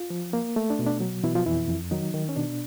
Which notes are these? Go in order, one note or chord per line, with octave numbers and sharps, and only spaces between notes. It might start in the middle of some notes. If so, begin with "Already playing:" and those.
Already playing: F4
F3
A#3
A3
D4
B2
D4
F#3
B2 E3 E4
F3 F4
F2 E3 E4
F2
D#3 F#3 D#4
D#3
C#4
B2 D4